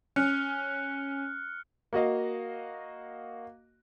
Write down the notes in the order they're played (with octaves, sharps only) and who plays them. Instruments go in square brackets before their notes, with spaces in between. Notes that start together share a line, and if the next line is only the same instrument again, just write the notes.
[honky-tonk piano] C#4 [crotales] F6 F#6 C#7
[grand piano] A#3 F#4 D#5 F5